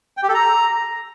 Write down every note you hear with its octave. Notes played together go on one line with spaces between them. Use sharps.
G5
G4
A4
A#5